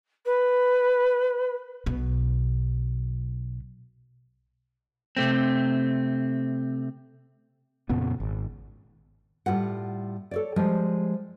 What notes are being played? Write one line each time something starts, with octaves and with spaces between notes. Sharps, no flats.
B4
B1 B2
C3 A3 C4
F2 A#2 C#3 B3
G#1
A2 G3 F4 F#5
A4 C#5 D5
F3 G3 G#3